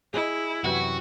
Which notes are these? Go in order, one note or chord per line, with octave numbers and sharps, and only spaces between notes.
E4 G#4 D#5
F#2 C3 E3 F#4